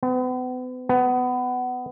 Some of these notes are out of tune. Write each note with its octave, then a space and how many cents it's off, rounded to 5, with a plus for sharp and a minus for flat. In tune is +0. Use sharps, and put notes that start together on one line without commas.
B3 +40
B3 +20